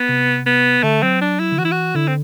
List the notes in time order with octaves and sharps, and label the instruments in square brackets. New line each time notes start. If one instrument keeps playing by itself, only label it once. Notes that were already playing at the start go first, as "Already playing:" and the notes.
Already playing: [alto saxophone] B3
[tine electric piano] C3
[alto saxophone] B3
[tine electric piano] D3 [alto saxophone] A3
[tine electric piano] F#3 [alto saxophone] C4
[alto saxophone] D4
E4
[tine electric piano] D3
[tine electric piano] E3 [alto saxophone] F#4
[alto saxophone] E4
F#4
[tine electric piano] D3 [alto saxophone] E4
[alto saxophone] C4